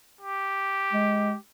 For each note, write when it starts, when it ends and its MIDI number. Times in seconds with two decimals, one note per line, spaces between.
0.21 1.36 67
0.93 1.34 56